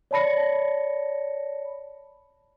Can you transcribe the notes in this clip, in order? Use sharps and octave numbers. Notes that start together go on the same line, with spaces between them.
C#5 D5 A5 B5 A#6 C#7